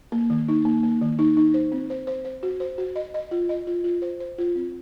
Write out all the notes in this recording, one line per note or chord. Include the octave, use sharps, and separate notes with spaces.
A#3
D#3
D#4
A#3
A#3
D#3
D#4
D#4
C5
C4
C5
C5
C5
F#4
C5
F#4
D#5
D#5
F4
D#5
F4
F4
C5
C5
F4
C4